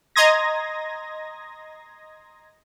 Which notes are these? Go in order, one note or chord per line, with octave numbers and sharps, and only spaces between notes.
D#5 A#5 C6 D#6 G#6 A#6